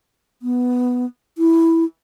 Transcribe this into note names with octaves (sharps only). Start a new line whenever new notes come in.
B3
E4